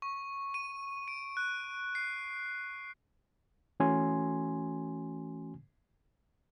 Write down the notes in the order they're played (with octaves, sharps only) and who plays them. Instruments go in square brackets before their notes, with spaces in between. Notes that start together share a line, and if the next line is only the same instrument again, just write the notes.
[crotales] C#6
D#7
D7
F#6
C7
[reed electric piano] E3 A3 C#4 F#4 G#5 C6